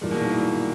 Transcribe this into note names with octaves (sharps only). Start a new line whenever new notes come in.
G2 A#2 E3 G#3
B2
D#3
E3